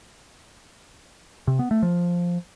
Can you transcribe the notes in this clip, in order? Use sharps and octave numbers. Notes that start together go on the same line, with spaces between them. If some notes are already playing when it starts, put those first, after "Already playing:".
C3
B3
A3
F3